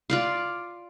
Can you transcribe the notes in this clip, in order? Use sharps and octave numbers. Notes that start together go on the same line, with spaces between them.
F4 D5 F5